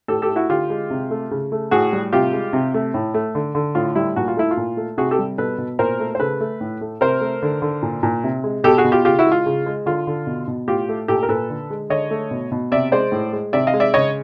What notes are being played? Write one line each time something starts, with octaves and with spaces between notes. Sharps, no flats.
A2 G4 A4
G4 A4
A3
E4 F#4
D3 F4 G4
G#3
C3
A3
C#3
A3
A2 F#4 G#4
G3
C3 F4 G4
G#3
C3
A3
A2
A3
D3
D3
A2 F4
G3 E4
A#2 F#4
F4
A3 E4
F4
A#2
A3
C3 F#4 G#4
G4 A4
G3
B2 A4 B4
B2
A#2 A#4 C5
A3
C5
C#3 A4 B4
A3
A2
A3
C3 A#4 C5
A3
D3
D3
A#2
A#2
C3
G#3
B2 G4 A4
F#4 G#4
B2
F4 G4
C#3 F4 G4
E4 F#4
G#3
F4
C#3
G#3
D3 F4
D3
B2
B2
A2 F4 G4
A3
A#2 G4 A4
A#4
A#2 A4 B4
D3
G#3
D3 C#5 D#5
A3
B2
B2
C3 D5 E5
G#3 C5 D5
A2
G#3
C3 D5 E5
D#5 F5
G#3
D5 E5
C#3 C#5 D#5